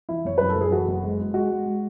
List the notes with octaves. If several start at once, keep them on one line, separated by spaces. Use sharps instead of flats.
E3 E4
F#1 C#5
F#2 B4
A4
F#1
G#4
E3 F#4
F#1
G#3
G#3
G#3 F#4
G#3
G#3